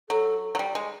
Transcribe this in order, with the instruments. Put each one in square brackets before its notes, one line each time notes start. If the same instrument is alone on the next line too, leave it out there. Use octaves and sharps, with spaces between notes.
[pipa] F#3 [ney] A4
[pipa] F#3
G3
G#3